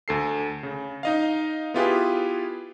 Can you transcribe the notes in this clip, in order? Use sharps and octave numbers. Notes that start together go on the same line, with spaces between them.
D2 A4 C7
C#3
D#4 D#5 F5
B3 E4 F4 G4 G#4 B4